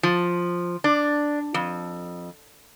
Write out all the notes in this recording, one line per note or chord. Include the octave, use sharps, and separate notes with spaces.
F3
D4
F2